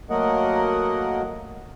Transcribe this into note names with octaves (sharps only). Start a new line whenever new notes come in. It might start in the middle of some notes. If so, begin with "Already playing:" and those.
F#3 A3 A#3 A#4 D#5 F#5